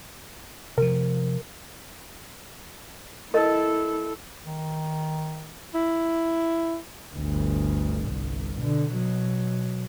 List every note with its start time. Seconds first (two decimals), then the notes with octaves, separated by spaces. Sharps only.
0.78 C3 F3 A#4
3.34 E4 A4 A#4 D#5
4.46 D#3
5.75 E4
7.15 G1 D2
8.05 G1 C2
8.60 B2 D3
8.92 B2 F#3